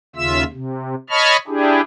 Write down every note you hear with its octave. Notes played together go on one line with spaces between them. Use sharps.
D#2 C#3 F4 E5 E6
C3
C#5 D#5 A5 B5 C#6 F6
D4 E4 G4 G#4